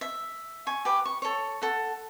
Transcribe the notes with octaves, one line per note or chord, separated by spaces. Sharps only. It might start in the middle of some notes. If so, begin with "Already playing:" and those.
E5
G#5 C#6
G4 B4 D6
C#6
A4 C#5
A4 F#5